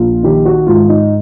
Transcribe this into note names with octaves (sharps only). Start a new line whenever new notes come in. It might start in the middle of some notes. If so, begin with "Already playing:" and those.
Already playing: A#1 F4
D#3 G4
F#4
G#2 F4
D#4